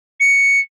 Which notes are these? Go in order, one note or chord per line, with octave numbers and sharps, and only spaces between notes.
C#7